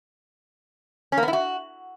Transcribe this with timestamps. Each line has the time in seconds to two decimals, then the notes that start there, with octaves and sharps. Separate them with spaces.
1.12 C#4
1.17 A#3
1.23 B3
1.28 E4
1.33 F#4